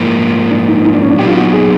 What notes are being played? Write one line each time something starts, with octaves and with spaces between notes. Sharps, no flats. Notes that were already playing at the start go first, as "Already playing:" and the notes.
Already playing: G#2 F3 A#3 E4
D4
D#4
D#4
D4
C#4
D4
A#2 F#3 B3 D#4 G4
F4
F#4
G#4